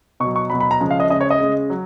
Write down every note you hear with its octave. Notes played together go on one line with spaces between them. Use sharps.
B2 F#3 C#6
C#6
B2 F#3 B5
B5
A#5
C#3 F3 G#3
F5
D#5
C#3 G#3 D#5
C#5
D#5
C#3 G#3
F#3